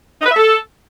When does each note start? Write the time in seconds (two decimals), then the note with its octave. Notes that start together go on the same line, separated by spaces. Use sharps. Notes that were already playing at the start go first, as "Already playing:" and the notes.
0.20 D#4
0.26 B4
0.31 E5
0.36 A4